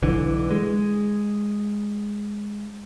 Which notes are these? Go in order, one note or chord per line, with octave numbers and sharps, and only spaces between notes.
B1 D3 E3
G#3